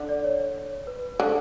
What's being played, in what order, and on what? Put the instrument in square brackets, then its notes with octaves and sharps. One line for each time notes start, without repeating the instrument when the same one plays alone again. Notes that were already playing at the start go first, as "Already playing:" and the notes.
Already playing: [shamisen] D3
[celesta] D5
C#5
B4
[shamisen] D3